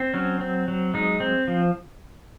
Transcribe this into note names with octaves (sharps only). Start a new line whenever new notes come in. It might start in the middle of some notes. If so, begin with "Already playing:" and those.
Already playing: C4
F#3 C#4
C4
F#3
G#3 D#4
C4
F3